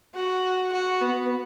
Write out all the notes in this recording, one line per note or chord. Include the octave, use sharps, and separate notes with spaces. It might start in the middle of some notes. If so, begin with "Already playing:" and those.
F#4
F#4
B3